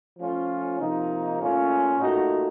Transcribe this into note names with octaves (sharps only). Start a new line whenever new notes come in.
F3 A3 C#4 F4
C3 F3 A#3 D#4
A#2 A3 C#4 F4
A#2 A3 D#4 F#4